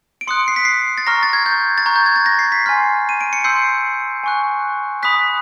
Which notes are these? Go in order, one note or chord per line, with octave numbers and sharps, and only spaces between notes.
D7
C6 D#6 F#6 C#7
C7
B6
C7
A6
A#5 C#6 F6 A#6
A6
G#6
G6
A6
A#5 C#6 F#6 G#6
G6
G#6
A6
A#6
C7
B6
G#5 C6 F6 C7
D#7
D7
C#7
C6 E6 G6 C7
G#5 C#6 F#6
B5 D#6 F#6 B6